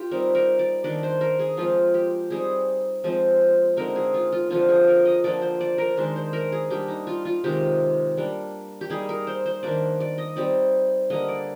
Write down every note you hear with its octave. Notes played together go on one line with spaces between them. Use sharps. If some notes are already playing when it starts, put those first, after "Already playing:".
Already playing: F4 G4
G3 C4 D#4 A#4
A#4
D5
D#3 A#3 D4 D5
C5
A#4
G#4
F3 G#3 C4 F4
G4
G3 C4 D#4 G#4
F3 G#3 C4
D3 G#3 C4 D#4 A#4
G#4
F4
F4
D3 F3 C4 F4
G#4
A#4
D#5
D3 F3 A#3 D4 D5
C5
D5
A#4
D#3 G#3 D4 C5
C5
A#4
G#4
G3 A#3 D4 G4
D#4
F4
F4
C3 D#3 G#3 D#4 G4
G3 A#3 D4
G4
G3 A#3 D#4 G#4
A#4
C5
C5
D#3 A#3 D4 D5
D5
D#5
G3 C4 D#4 D5
D3 G3 A#3 D#5
D5